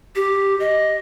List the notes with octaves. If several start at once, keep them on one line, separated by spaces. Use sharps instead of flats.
G4
D#5